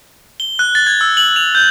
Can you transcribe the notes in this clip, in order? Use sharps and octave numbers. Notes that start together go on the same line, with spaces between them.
G7
F#6
A6
G#6
E6
F#7
F7
G6